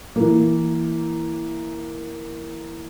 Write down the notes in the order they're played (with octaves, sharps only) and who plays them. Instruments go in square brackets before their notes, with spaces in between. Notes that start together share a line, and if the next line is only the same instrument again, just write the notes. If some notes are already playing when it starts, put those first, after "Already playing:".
[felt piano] E3 A#3